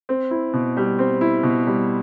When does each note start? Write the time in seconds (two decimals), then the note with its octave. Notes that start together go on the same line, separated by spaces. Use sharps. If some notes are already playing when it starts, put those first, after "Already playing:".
0.09 C4
0.31 E4
0.53 B2
0.77 G3
0.99 C4
1.21 E4
1.43 B2
1.67 G3